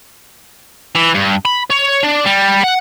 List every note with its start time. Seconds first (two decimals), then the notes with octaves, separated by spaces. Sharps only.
0.95 E3
1.14 G2
1.45 B5
1.70 C#5
2.03 D4
2.26 G3
2.64 F#5